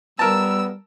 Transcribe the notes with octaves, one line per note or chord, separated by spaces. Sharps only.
G3 B3 A#4 A5 E6